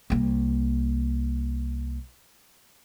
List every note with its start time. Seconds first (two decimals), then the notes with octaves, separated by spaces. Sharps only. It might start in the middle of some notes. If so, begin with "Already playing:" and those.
0.10 C2 A#3